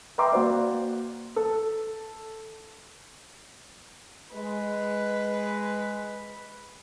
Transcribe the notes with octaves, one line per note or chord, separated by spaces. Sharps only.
B4 E5 G5 A#5 C6 D6
A#3 F#4 C5 D5
A4
G#3 B4